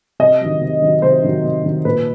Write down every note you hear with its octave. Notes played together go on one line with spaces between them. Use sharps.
C3 D#5
D#3 F#3
C3
D#3 F#3
C3 C5
D#3 F#3
C3
D#3 F#3
A#2 B4